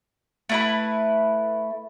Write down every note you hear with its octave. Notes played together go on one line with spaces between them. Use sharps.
A3 E4 B4